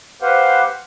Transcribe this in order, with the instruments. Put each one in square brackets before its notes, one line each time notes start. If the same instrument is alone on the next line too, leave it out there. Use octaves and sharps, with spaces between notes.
[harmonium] G4 B4 C5 F5 F#5